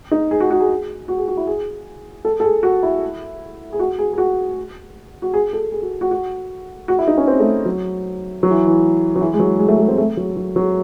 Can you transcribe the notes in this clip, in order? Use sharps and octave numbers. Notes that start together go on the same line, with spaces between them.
D#4
G#4
F#4
F#4
G#4
F#4
G#4
F#4
E4
G#4
A4
A4
G#4
F#4
E4
G#4
F#4
G#4
G#4
F#4
F#4
G#4
A4
G#4
F#4
F#4
F#4
F#4
E4
D#4
C#4
C4
A3
F#3
F#3
E3
E3
F#3
E3
G#3
F#3
G#3
A3
A3
C4
A3
F#3
F#3
F#3